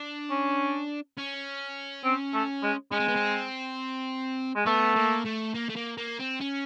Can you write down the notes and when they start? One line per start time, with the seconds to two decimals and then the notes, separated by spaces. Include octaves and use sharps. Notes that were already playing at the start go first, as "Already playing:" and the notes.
Already playing: D4
0.30 C#4
1.17 C#4
2.04 C4
2.34 A3
2.63 G#3
2.92 G#3 C#4
3.00 C4
3.08 B3
3.16 C4
4.56 G#3
4.66 A3 B3
4.96 A#3
5.25 A3
5.54 A#3
5.69 A3
5.76 A#3
5.97 A#3
6.19 C4
6.41 C#4